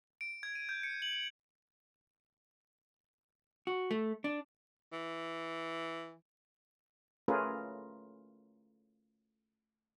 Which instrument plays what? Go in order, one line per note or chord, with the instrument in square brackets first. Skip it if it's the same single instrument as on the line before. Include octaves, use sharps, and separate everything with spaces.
[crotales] D7
G#6
D#7
G6
C#7
F#7
[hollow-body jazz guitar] F#4
A3
D4
[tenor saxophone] E3
[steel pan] A3 C#4 F4 G#4 A#4 B4